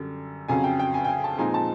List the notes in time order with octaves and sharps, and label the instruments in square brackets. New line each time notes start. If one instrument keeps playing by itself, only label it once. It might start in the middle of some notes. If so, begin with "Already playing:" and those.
Already playing: [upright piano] F#2 D3 G3
F2 C#3 F#3 G#5
G5
G5
G#5
G5
G#5
A5
A#2 F3 G#3 C4 D#4 G#5
A5